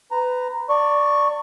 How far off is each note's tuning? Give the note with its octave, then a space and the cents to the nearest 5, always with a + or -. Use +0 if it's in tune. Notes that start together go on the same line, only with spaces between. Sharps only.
B4 +25 A#5 +0
D5 +0 A5 +40 C#6 +0